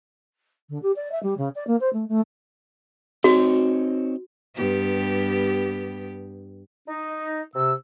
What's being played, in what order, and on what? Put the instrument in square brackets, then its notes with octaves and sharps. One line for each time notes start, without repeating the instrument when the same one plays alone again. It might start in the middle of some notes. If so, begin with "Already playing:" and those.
[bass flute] D3
G4
D5
E5
G3
C#3
D5
A#3
C5
A3
A3
[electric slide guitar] C4 D#4 C#5 [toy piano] F#4
[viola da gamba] G2 B3 G4
[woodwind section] D#4
C3 E6